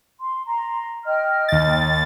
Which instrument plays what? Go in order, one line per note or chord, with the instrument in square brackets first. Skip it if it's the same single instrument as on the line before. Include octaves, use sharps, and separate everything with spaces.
[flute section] C6
A#5 C6
D#5 G5 F6
[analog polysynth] D#2 A6